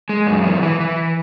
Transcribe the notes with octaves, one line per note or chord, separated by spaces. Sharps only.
G#3
F#2
E3
E3
E3